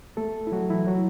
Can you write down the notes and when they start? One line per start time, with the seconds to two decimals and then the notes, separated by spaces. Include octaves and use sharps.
0.17 A3 A4
0.47 E4
0.52 F#3 F#4
0.70 E3 E4
0.87 F#3 F#4